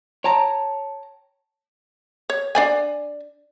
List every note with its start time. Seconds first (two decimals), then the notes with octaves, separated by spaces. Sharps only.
0.24 C#5 G5 A5 A#5
2.30 C#5
2.55 D4 D5 G#5